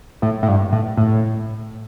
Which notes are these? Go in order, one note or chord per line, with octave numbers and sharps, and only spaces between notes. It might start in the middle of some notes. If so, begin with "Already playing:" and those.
A2
A2
G2
A2
A2